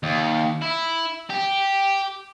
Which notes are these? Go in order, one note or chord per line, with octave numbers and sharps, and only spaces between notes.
D#2
E4
G4